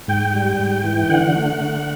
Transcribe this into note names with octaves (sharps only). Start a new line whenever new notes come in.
G#2 G5
G3
G#2
E3
D3 F#5
A3
D3